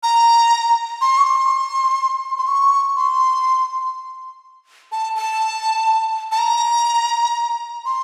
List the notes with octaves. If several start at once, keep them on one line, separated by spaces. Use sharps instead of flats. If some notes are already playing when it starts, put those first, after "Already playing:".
A#5
C6
C#6
C6
C6
C#6
C6
A5
A5
A5
A#5
C6